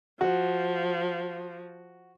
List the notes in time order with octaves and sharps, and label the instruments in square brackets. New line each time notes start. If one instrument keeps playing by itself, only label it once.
[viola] F3 [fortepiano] F#4